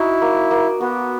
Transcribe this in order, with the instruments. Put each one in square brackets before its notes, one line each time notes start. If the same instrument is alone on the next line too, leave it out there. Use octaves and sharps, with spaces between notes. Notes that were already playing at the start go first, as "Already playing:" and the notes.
Already playing: [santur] D#4 F#4 [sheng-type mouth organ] E4
[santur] A#3
A#3
[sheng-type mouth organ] B3 [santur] F#4